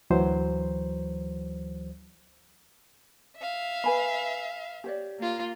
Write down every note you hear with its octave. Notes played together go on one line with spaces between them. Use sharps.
D2 E3 F#3 C5
E5 F5
B4 G#5 B5
G4 C#5 D5
A#3 F4